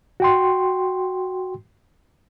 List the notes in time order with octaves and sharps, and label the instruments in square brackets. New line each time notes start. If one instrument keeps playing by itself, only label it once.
[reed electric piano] F#4 G5 C6